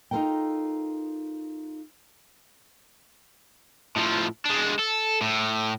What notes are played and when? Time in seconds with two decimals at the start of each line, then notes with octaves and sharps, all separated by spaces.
0.11 D#4 F4 F#4 A4 A#4 G5
3.96 A2 F3
4.46 G#3 D4
4.79 A4
5.21 A2